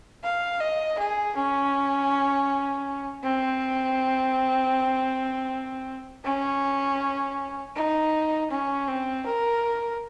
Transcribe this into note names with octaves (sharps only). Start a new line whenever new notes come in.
F5
D#5
G#4
C#4
C4
C#4
D#4
C#4
C4
A#4